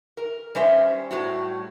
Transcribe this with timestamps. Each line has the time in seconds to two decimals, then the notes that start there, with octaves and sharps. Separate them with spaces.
0.17 A#4
0.55 G3 C#4 C5 E5
1.11 A2 G3 F#4